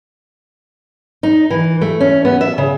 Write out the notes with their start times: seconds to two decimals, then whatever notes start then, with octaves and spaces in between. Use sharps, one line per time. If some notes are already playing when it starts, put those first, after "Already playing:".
1.23 D#4
1.50 E3
1.82 A3
2.00 C#4
2.25 B3
2.41 E5
2.58 C#3